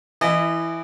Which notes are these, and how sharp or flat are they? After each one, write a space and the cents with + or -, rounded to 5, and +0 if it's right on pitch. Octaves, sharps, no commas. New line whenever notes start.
E3 +10 E4 +0 D#5 -25